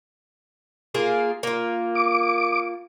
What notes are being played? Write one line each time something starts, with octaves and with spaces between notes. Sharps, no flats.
A#3 F4 G#4
A#3 F4
D6